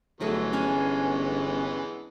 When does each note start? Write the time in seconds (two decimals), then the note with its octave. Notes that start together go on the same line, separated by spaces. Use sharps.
0.21 G1 E3 F#3 G#3 A3 B3 G#4
0.53 C#4 D4 F5 G#5